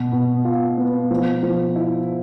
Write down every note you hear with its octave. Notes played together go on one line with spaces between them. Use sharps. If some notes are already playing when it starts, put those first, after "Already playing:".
Already playing: B2
B2
F4
B3
F3
F3
E4